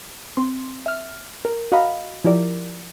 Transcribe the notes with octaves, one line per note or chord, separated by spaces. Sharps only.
C4 C6
E5 F6
A#4
F#4 D#5 F5 A#5 B5
F3 E4 G4 A#4 D5